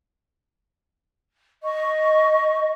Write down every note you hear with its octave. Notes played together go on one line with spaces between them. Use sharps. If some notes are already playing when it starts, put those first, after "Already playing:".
D#5 C#6